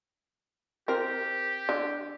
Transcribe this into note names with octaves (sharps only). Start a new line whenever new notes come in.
C4 G4 A#4
D3